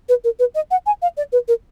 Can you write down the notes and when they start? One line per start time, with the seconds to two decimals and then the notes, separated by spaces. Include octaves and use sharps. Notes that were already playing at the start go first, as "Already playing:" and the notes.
0.09 B4
0.24 A#4
0.39 B4
0.55 D#5
0.71 F#5
0.86 G#5
1.02 F5
1.17 D5
1.32 B4
1.48 A#4